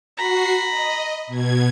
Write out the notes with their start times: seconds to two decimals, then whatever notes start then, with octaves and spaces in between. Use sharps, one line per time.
0.17 F#4 A#5 B5 C7
0.70 D#5
1.27 B2 G#6